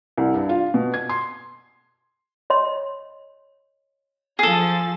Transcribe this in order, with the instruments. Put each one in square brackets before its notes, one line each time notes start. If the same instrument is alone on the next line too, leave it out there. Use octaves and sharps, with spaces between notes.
[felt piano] C2
G2
F4
B2
G#6
C6
[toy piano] C#5 D#5 C6
[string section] F3 A6 [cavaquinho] G#4 A4